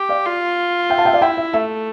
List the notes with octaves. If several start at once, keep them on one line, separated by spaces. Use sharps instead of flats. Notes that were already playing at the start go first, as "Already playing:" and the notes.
Already playing: G4
D5 F5
F4
E5 G5
F5 A5
E5 G5
D5 F5
E4 E5 G5
E5
A3 E5